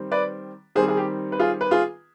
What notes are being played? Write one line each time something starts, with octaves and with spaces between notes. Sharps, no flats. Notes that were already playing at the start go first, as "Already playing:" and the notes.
Already playing: D#3 G3 C4
B4 D5
D#3 G3 C4 G#4 C5
G#4
G4
B4
F4 G#4
B4
F4 G#4